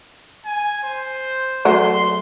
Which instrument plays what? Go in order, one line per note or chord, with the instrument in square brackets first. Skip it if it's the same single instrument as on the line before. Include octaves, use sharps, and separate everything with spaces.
[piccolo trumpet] G#5
C5
[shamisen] F#3 A3 [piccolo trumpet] C6